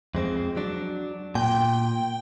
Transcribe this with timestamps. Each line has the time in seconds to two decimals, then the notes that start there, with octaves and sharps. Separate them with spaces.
0.15 F2 G#3 C4
0.56 F#3 D4
1.35 A#2 G5